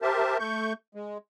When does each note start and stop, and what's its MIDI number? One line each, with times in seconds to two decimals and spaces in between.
0.02 0.38 67
0.02 0.38 70
0.02 0.38 72
0.02 0.38 76
0.02 0.38 81
0.39 0.73 57
0.39 0.73 85
0.39 0.73 91
0.95 1.18 56